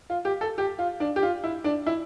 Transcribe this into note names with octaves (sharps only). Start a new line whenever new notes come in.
F4
G4
A4
G4
F4
D4
G4
F4
E4
D4
E4